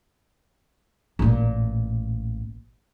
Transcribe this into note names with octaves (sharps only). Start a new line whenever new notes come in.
A1 A#2